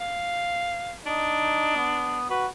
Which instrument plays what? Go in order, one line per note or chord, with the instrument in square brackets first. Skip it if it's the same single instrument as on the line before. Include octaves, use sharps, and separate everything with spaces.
[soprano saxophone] F5
[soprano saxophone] D4 [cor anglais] D#4
[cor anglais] B3
[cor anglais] F#4 [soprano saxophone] B4